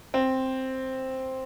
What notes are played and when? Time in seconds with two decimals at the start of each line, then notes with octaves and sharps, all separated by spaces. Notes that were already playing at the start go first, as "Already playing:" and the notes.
0.14 C4